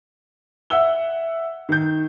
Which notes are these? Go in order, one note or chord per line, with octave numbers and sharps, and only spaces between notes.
E5 F#5 E6 G7
D#3 G6